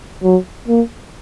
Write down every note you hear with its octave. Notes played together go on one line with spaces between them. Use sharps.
F#3
A#3